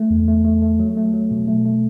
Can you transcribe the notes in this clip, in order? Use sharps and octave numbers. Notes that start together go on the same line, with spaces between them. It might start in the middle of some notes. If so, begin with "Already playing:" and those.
Already playing: A3
E2
A3
A3
A3
F#3
A3
F#3
B2
A3
A3